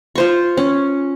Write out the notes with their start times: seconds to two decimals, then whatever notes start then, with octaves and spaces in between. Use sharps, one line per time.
0.15 F4 C5 C#6
0.57 C#4